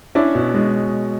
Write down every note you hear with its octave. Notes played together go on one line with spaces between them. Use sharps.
C#4 D4 E4
B2
G#3